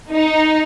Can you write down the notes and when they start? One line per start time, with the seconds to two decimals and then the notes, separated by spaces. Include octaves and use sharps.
0.12 D#4